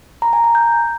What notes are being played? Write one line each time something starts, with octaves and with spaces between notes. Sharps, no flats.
A#5
G#5
A#5
G6